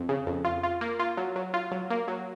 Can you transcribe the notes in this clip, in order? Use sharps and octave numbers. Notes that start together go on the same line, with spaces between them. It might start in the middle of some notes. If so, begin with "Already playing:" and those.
Already playing: F2
C#3
F2
F4
F4
A#3
F4
F#3
F#3
F4
F#3
A#3
F#3